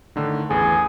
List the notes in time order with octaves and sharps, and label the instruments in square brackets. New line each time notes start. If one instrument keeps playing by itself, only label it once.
[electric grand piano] A2 D3 D#3
[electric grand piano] A1 E2 [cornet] G#4